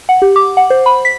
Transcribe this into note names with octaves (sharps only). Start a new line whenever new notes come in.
F#5
G4
D6
F#5
C5
B5
B6